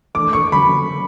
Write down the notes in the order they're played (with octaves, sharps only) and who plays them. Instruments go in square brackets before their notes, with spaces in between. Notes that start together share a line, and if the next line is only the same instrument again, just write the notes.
[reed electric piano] E3 A3 D4 A4 [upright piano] D6
[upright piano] C#6
[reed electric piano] D3 F#3 C#4 [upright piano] B5